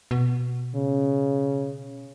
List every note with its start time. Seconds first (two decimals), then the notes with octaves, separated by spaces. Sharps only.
0.11 B2
0.75 C#3